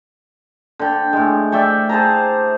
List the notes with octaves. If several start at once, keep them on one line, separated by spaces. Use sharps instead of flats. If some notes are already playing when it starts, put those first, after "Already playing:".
D3 G5
A2 G#3
D5 E5 G5 C#6
G#4 C5 A5 A#5